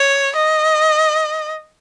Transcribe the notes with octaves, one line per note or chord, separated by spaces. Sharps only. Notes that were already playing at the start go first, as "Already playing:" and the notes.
Already playing: C#5
D#5